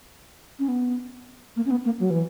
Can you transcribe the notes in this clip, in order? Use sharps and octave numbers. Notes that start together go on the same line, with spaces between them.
C#4
B3
A#3
C#4
B3
A#3
F#3
E3